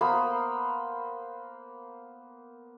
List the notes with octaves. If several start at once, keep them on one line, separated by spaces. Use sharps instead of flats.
A#3 B3 C5 B5